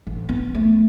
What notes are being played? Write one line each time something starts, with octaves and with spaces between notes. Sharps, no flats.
A1
B3
A3